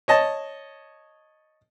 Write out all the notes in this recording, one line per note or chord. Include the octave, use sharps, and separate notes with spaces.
C#5 D#5 A5